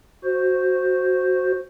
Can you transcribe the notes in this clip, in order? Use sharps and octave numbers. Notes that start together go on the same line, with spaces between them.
F#4 C5